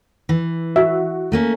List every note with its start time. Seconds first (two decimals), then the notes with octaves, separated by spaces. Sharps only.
0.29 E3
0.76 F#4 E5
1.32 A3 A#3 C#4